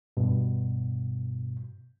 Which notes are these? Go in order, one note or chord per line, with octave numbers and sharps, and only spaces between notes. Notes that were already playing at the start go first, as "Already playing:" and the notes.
G2 B2